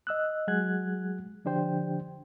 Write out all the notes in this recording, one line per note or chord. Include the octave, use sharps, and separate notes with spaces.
D#5 E6 F#6
F#3 G#3 G#4 F#5 F#6 G#6
D3 F3 D4 G4 C5 G5